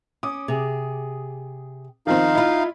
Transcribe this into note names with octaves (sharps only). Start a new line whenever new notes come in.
C#4 D6 D#6
C3 G#4
D#3 F3 C4 D#4 F5
E4 F4 D#5 B5